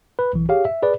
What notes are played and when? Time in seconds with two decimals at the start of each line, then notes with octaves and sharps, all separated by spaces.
0.19 B4
0.33 B1 E3
0.49 G4 G#4 C#5 F5
0.65 E5
0.83 G#4 B4 D5